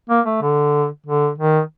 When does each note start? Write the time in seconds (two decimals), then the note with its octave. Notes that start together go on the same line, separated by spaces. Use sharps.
0.10 A#3
0.26 A3
0.42 D3
1.06 D3
1.38 D#3